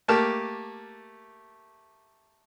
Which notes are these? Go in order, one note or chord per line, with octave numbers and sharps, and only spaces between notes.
A3 A#3 G4 A5 F6